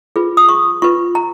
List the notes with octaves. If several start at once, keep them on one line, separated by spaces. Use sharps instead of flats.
F4 G#4 B4
D#6
C#6
F4 B4 C#6
A#5